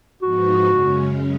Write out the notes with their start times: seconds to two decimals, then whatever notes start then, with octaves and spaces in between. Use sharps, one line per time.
0.22 G#2 F3 B3 D#4 F#4
0.67 F#2 C#3 G#3 C#4